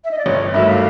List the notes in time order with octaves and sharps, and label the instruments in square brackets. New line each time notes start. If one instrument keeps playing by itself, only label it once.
[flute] E5
D#5
D5
[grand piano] G1 [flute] C#5
[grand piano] G2 D#3 F#3 A3 [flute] E5
[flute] F5